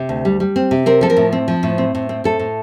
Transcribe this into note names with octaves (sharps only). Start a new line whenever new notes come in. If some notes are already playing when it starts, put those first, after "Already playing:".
Already playing: C3
D2
G3
G3
C4
C3
C4 A#4
F3 A4
A#4
A2
C4
F3
A2
C4
A2
C4
A2 A4
A2